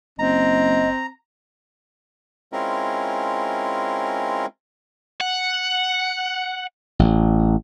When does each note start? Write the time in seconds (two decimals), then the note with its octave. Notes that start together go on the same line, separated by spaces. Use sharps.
0.19 F#1 C4 D#5 A#5
2.53 G#3 C4 C#4 E4 F4 A#4
5.21 F#5
6.99 A1